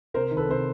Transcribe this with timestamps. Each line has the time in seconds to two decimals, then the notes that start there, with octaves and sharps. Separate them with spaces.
0.14 C3 A#4 C5
0.31 D#3
0.37 A4 B4
0.49 C3 C5